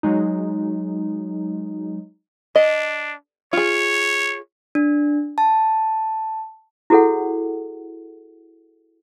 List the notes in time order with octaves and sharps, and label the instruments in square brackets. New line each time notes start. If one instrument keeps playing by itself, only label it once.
[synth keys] F#3 G#3 D#4
[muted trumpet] D4 [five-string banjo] D#5
[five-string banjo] F4 G#4 [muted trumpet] C#5
[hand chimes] D4
A5
[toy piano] E4 F#4 G#4 A4 C#5 F#5